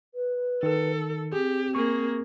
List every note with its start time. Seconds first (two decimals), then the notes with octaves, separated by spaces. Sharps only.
0.14 B4
0.63 D#3 A4
1.32 C4 G4 G#4
1.75 A#3 G#4 C#6